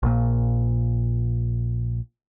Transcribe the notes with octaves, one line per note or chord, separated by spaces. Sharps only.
A#1 A#2